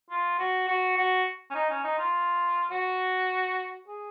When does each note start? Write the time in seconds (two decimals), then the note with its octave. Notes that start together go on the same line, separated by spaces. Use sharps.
0.10 F4
0.39 F#4
0.68 F#4
0.97 F#4
1.50 C#4
1.55 D#4
1.70 C#4
1.84 D#4
1.98 F4
2.71 F#4
3.88 G#4